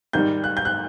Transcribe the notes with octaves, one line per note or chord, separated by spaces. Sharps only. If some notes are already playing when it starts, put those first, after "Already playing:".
G#2 D#3 G3 G6
F#6
G6
F#6